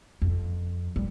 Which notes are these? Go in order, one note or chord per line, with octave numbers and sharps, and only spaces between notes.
F2
G3